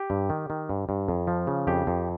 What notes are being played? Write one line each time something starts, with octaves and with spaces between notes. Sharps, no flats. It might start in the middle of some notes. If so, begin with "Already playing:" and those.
Already playing: G4
G2
D#3
D#3
G2
G2
F2
F3
C#3
F2 G4
F2